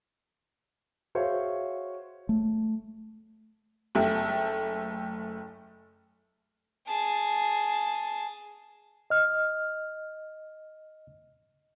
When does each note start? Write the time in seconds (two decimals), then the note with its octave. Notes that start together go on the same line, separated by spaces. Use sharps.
1.15 F#4 G#4 C5 C#5 E5 F5
2.29 A3
3.95 F#1 A3 E5 G5
6.88 G#4 A5
9.10 D#5 F6